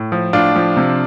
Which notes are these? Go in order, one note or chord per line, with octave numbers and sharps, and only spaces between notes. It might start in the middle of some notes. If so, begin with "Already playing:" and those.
Already playing: A2
F3
A2 D4 F4
F3
C3